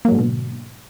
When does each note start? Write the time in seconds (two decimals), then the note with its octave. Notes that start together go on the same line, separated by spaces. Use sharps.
0.05 A#3
0.08 F#3
0.12 G#2
0.15 D3
0.18 B2